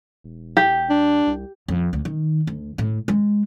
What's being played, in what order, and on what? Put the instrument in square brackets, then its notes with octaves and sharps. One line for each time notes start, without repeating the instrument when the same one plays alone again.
[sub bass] E1
[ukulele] G4
[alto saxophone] D4
[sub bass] C2
[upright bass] F2
D2
D#3
D2
A2
G#3